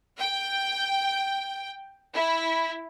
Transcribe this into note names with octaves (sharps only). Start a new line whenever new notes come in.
G5
E4